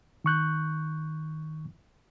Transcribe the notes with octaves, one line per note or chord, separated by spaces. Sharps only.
D#3 C#6 F#6 G6